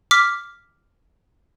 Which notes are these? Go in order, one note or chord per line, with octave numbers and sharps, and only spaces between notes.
D6 F6 B6